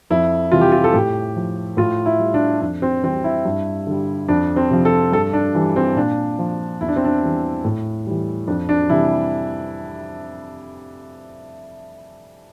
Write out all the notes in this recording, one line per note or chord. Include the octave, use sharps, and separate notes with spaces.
F2 E4
C3 E3 G3 F4
G4
F4
A4
A2 G4
F3
A2 F4
E4
G3
D4
F2 D4
C4
E3 G3 C4
E4
G2
D3 G3
F2 D4
C4
C3 F3
A4
G2 A4
D4
E3 G3
C4
A#2 D4
F3
E2 E4
D4
C4
D4
E3 G3
A2
E3 G3
F2 D4
D4
C3 E3 G3 E4